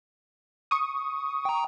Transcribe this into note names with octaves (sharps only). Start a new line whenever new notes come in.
C#6 D#6
G5 A#5